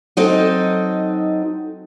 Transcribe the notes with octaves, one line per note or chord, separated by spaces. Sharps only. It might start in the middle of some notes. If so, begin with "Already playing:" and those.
F#3 C4 D#4 A4 D#5